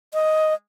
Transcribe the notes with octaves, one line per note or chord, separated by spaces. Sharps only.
D#5